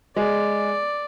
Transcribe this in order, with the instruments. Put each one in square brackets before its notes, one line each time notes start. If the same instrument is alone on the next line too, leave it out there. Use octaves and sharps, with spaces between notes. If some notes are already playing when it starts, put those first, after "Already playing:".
[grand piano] G#3 [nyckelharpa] D5